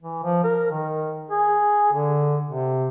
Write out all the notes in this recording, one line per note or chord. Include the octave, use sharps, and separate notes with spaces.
E3
F3
A#4
D#3
G#4
D3
C3